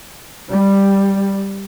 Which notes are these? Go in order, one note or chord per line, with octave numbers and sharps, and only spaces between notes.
G3